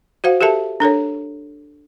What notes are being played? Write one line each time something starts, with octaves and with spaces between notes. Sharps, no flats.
F#4 C5 F5 F#5
G4 A4 A#4 E5 A5
D4 A4 A#4 C#5